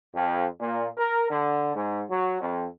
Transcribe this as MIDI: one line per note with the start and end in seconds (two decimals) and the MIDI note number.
0.16 0.46 41
0.60 0.87 46
0.98 1.26 70
1.30 1.75 50
1.75 2.03 44
2.10 2.39 54
2.41 2.65 41